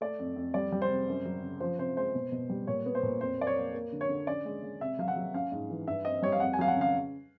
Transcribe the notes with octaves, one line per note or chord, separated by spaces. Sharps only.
A3 D5
F2
F2
G3 D5
G3
C5
C3
F#2
F#3
C#3
F3 C5
C3 C5
G#3 C5
B2
B2
G3
A#2 C#5
B3
C5
A#2
F2 C5
A#3 D5
C#5
A#3
A#3
D3
C#5
D3
C#4 D5
G#3
G#3
C3 E5
F#3 F5
F#5
F#3
C#4 F5
G#2
E3
G2 E5
C4 D#5
G3 C#5
F5
F2 F#5
G#5
F#3 F5
F#5
C#3
F5